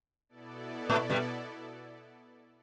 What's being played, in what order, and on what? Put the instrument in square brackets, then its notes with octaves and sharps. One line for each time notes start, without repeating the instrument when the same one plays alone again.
[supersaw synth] B2 B3 E4 A4 D5
[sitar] A2 A3
G2 G3